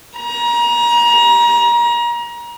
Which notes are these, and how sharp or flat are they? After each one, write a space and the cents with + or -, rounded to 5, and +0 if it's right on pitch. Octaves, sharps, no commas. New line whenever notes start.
A#5 +30